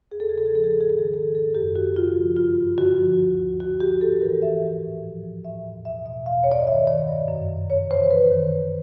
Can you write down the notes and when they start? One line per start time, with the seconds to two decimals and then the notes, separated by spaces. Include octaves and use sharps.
0.11 E2 G#4
0.20 A4
0.29 C#3 G#4
0.38 A4
0.46 G#4
0.52 F3 A4
0.64 G#4
0.73 G#2 A4
0.81 G#4
0.90 D#3 A4
0.99 G#4
1.13 D#3 A4
1.34 G#2 A4
1.54 F#2 G4
1.76 F#2 F#4
1.96 C#3 F4
2.16 F3
2.37 G2 F4
2.57 G2
2.78 D3 F#4
2.98 F3
3.19 D2
3.40 D2
3.60 D3 F#4
3.80 F3 G4
4.00 G#2 A4
4.21 E3 A#4
4.42 E3 E5
4.62 G#2
4.83 A2
5.03 F3
5.24 F3
5.44 A2 E5
5.65 E2
5.85 B2 E5
6.06 B2 E5
6.26 E2 F5
6.44 C#5
6.46 G2
6.52 D5
6.60 D#5
6.67 D#3 E5
6.87 D#3 D5
7.08 G2
7.28 F#2
7.49 F#2
7.70 C#3 C#5
7.90 E3 C5
8.11 F#2 B4
8.31 D#3
8.52 D#3